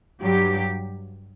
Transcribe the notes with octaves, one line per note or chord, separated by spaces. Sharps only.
G2 F#3 G4